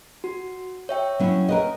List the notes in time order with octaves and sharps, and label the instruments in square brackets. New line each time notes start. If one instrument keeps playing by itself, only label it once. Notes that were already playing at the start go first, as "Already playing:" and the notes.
[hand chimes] F#4
C#5 E5 G5
[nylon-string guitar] F#3 C#4 E4
A#4 B4 D#5